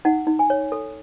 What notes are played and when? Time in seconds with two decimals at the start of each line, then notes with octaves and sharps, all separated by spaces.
0.05 D#4 F#5
0.27 D#4
0.39 G#5
0.50 C#5
0.72 A4